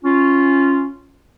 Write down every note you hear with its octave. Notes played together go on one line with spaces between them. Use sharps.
C#4 F4